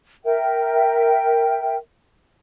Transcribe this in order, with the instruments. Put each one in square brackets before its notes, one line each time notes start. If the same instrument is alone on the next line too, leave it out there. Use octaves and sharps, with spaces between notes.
[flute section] A#4 E5 G5